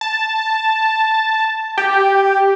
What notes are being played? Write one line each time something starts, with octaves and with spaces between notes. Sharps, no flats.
A5
G4